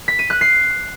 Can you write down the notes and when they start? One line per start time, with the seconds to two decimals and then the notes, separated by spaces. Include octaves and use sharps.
0.08 B6
0.19 D#7
0.30 F#6
0.41 C7